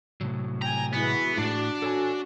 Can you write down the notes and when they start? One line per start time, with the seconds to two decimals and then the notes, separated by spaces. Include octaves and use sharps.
0.21 A2 C3 F#3
0.62 G5 G#5 A#5
0.93 E3 G#3 B3 F#4
1.38 A2 D4 F#4
1.82 F#4 A4 C#5 G#5